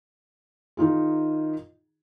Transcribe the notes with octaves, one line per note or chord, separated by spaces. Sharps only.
D#3 D#4 F4 G#4